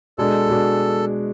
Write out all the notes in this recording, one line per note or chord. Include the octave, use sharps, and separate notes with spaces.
B2 G#3 D4 A4
B2 G#3 D4